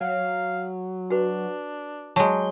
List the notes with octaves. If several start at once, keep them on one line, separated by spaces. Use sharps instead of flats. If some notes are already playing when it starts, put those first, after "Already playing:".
F#3 F5
D4 F#4 B4
F#3 G#3 A5 G6